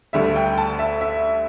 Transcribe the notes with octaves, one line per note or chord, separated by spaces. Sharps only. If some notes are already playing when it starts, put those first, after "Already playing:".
D2 D3 G3 E5
G5
A5
E5
E5